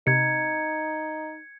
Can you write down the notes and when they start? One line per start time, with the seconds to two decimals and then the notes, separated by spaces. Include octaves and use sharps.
0.07 C3 D#4 G#6 C#7